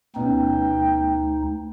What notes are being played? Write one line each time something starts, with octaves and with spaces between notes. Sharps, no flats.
D2 B2 C#4 D#4 G5